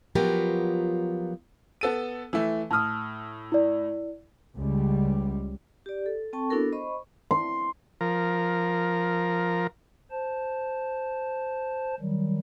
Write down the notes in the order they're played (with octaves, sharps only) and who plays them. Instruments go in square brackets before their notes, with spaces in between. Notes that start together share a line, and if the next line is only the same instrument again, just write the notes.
[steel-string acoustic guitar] F3 F#3 B3 F4 G4 A#4
[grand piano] B3 A4 D#7
E3 A3
[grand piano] A2 D#6 [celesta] A5 F6
[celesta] E4 D5
[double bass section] C#2 G3
[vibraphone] G4 D5
A4
C4 A4 G5 A5 C#6
B3 D4 E4 F#4 A4 A#4
C5 D#5 B5 C#6
[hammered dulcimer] C6
[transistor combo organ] F3 A#4
[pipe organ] C5 A5
D#3 F#3 G3